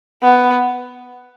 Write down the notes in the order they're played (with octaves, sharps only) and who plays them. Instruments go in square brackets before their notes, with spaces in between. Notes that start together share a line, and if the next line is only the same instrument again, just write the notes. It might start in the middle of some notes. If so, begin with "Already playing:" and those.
[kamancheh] B3